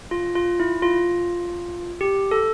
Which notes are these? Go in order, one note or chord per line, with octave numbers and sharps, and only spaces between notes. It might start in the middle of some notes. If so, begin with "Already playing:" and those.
F4
F4
E4
F4
G4
A4